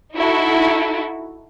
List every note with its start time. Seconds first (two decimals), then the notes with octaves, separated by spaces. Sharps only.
0.14 D#4 E4 F#4 A4